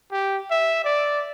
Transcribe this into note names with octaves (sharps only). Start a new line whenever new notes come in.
G4
E5
D5